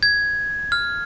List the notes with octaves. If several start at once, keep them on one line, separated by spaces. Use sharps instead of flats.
G#6
F6